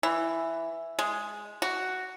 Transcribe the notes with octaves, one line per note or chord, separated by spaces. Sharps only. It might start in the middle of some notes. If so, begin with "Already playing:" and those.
E3
G#3
F#4